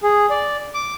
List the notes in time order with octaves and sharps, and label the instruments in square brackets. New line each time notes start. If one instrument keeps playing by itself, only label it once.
[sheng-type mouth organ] G#4
D5
D6